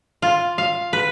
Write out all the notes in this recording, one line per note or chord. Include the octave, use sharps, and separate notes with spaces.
F4
F5
B4